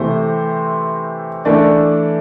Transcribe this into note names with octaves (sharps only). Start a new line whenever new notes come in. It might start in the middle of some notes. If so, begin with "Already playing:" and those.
Already playing: C3 E3 A3 C5
E3 A3 D4 D5